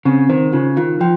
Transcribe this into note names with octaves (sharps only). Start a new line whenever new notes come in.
C#3 C4
D#3 C5
C#3 F4
D#3 F4
F3 G5